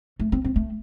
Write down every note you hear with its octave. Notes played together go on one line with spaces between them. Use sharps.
A3
C4
C4
A3